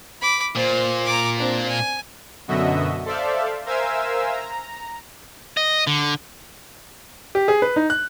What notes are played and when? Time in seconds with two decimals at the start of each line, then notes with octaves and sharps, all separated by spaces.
0.21 B5 D6
0.55 A#2 C5
1.06 A#5 D6
1.39 C4 D4
1.68 G#5
2.48 F#2 B2 D3 F#4 D#5 E5
3.05 A4 C5 D5 E5 F5
3.66 A#4 C5 E5 F5 G#5 E6
4.32 A#5
5.57 D#5
5.87 D3
7.35 G4
7.48 G#4
7.62 B4
7.76 D#4
7.90 F#6